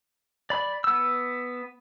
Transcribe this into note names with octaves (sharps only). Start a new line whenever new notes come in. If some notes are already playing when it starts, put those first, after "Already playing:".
D5 B5
B3 E6